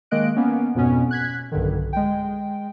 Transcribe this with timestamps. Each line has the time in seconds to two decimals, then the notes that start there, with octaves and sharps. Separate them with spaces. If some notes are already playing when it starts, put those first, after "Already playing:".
0.11 D#3 G#3 A#3 D#5 F#6 D7
0.36 A#3 B3 C#4
0.75 F2 G#2 B2 B3 C#4
1.11 F#6 G#6 B6
1.52 B1 G2 D3 D#3
1.93 G#3 G5